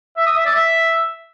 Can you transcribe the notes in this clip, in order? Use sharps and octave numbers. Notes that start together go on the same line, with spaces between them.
E5
D#6
E5
D5
E5